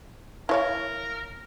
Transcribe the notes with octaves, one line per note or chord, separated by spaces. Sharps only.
E4 A#4 C#5 F5